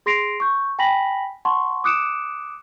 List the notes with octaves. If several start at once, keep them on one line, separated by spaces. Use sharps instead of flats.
G#4 C6 A#6 C7 D7 F7
C#6 G6
G5 G#5 B5 A#6 B6 F#7
F#5 A5 C6 C#6
D6 D#6 F#6 C#7 D7 E7